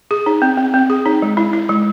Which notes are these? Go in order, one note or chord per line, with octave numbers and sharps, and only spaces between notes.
G#4
D#4
C4
C4
C4
G#4
D#4
G#3
E4
E4
G#3